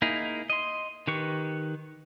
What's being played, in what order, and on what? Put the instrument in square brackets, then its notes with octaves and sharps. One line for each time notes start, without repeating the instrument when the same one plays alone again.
[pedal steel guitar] A#3 D#4 E4 G#4
D#5 C6
D#3 G4 B4 C#6